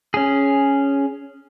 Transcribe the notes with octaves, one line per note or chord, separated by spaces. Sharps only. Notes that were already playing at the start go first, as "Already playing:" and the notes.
C#4 G#4